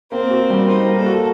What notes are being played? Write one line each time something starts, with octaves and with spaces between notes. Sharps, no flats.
A#3 C4
F#4
G3
D#4 C5
A#3
A4
F#4